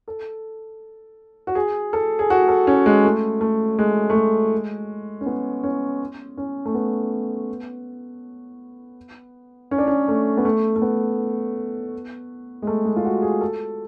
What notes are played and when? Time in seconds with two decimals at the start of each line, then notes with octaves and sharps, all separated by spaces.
0.08 A4
1.47 F#4
1.55 G#4
1.93 A4
2.19 G#4
2.30 F#4
2.48 A4
2.67 C#4
2.86 G#3
3.04 A3
3.41 A3
3.79 G#3
4.10 A3
4.15 G#3
5.21 C#4
5.26 B3
5.63 C#4
6.37 C#4
6.65 A3
6.75 B3
9.71 C#4
9.78 D4
9.87 C#4
10.08 A3
10.37 B3
10.45 A3
10.76 A3
10.82 B3
12.62 G#3
12.67 A3
12.85 G#3
12.96 F4
13.05 F#4
13.22 G#4
13.41 A4